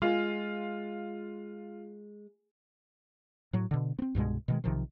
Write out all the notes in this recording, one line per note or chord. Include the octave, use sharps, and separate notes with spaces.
G#3 F4
A2 F#3
B2 D3
B3 C4
C2 G2 B2 G#3
B2 D#3 G#3
B1 C3 D#3 F3